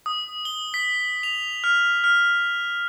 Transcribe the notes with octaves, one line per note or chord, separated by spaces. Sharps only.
D#6
G7
B6
F7
F6
F6